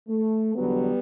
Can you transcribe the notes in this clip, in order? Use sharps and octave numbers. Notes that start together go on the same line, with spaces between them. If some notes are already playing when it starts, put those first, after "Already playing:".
A3
E2 D3 F#3 G3 B3